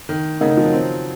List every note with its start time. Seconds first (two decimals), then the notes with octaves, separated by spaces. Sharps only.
0.09 D#3
0.41 C#3 A3 D#4 A#4 D#5 F#5
0.49 D#3
0.57 F3
0.65 F#3
0.73 C4